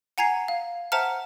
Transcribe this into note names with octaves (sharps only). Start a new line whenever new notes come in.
F#5 G#5 A#5 G#6 C7
F5
C5 E5 F#5 A5 A#5 F6